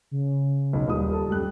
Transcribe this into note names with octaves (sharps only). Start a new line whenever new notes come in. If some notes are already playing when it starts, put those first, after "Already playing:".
C#3
B1
D#1 G3 D#6
A4
F#2 G3 F#6